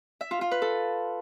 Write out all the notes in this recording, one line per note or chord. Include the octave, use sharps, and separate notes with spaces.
E5
F4
F4
B4
A4